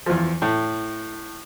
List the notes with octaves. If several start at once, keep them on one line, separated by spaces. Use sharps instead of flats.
E2 F3
A2